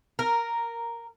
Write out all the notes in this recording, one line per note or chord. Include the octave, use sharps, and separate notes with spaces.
A#4